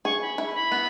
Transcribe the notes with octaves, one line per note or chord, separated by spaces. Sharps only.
G#4 C#6
B5
E4
B5
B3